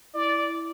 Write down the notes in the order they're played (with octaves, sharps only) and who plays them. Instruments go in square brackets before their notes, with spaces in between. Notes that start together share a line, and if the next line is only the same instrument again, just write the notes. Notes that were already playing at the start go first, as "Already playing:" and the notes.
[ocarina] E4 [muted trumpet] D5